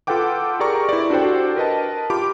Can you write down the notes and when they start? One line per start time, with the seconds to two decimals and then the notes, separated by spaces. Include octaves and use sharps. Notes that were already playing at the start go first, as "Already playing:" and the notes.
0.07 F4 A4 B4 F#5 G5 D6
0.60 G4 G#4 A#4 D5 A#5 C#6
0.89 E4 B4 D5
1.10 D4 F#4 G4 A4 C5 G5
1.56 A#4 B4 D#5 A5
2.10 F4 G4 B5 D6